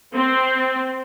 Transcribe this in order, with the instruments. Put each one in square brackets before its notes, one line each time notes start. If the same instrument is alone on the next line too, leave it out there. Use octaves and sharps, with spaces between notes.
[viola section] C4